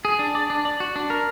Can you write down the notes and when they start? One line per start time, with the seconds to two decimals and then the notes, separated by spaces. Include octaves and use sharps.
0.05 G#4
0.19 D4
0.35 D5
0.50 D4
0.65 D5
0.80 F#4
0.96 D4
1.10 A#4